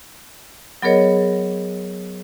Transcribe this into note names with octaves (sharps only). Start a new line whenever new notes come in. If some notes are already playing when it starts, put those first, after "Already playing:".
F#3 B3 G#4 A#4 C#5 D#5